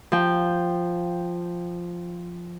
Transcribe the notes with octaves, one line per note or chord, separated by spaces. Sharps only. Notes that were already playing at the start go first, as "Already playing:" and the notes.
F3 G5